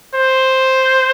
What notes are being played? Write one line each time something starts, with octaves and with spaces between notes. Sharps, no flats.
C5